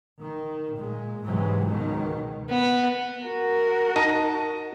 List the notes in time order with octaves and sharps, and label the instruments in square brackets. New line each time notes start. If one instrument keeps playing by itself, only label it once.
[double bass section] D#3
A#2 G#3
C#2 G#2 C3 E3 F#3 G#3
C#2 G#2 B2 D#3 G#3
[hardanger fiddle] B3
[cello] F#4 A#4
[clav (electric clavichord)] D#4 [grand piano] A5 A#6 D#7